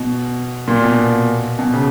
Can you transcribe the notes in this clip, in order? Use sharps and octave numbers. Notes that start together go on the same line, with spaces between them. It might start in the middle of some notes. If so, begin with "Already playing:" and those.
Already playing: B2
A#2
B2
B2
C#3